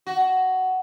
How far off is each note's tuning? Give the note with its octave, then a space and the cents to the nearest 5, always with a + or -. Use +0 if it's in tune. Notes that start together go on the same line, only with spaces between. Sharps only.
F#4 +10